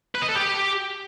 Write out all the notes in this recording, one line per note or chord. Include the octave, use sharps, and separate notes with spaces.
B4
D#5
A4
G4